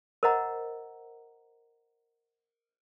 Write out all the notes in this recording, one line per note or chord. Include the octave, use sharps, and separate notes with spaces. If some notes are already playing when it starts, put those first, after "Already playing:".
A#4 C5 D#5 F#5 A#5